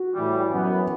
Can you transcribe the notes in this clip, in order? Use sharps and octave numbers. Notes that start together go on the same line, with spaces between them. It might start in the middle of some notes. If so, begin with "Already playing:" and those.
Already playing: F#4
A2 E3 G3
F#2 E3 B3